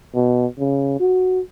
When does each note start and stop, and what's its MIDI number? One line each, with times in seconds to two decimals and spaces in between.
0.15 0.46 47
0.59 0.95 49
1.00 1.40 66